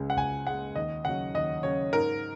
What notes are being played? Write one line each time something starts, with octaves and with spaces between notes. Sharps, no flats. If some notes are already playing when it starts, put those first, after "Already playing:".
Already playing: C#2 C#3 G#3
F#5
C#2 G#5
C#3 G#3 F#5
D#2 D#5
C#3 F#3 F#5
D#2 D#5
C#3 F#3 C#5
G#2 A#4